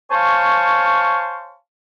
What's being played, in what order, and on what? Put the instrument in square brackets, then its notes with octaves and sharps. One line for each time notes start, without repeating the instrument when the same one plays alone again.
[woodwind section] C5 C#5 F5 G#5 A5 C#6